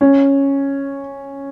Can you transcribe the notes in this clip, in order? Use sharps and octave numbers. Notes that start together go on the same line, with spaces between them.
C#4